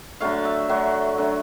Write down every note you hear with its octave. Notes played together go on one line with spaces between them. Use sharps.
D3 F#3 A3 F5
E5
D3 F#3 A3
D3 F#3 A3